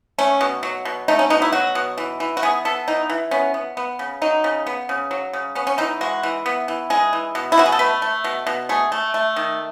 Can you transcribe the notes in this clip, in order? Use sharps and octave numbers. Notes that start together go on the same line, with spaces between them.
A3 C#4
B2
F#3
B2
A3 D#4
C#4
B2 D#4
E4
F#3 F#4
B2
E3
E3
F#4
B3 G#4
B3 A4
E3 D#4
E3
B3 C#4
B3
B3
C#3
F#3 D#4
C#3
B3
C#3
F#3
C#3
B3 C#4
C#4
E3 D#4
G#3 F#4
E3
B3
E3
G#3 G#4
E3
B2
E4
B2 F#4
G#4
A4
A3 B4
A3
B2
B2
A3 G#4
A3
A3
D#3